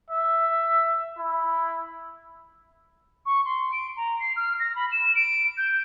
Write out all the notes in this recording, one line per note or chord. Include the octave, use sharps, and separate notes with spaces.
E5
E4
C#6
C6
D7
A#5
C7
F6
A#6
B5
E7
D7
G6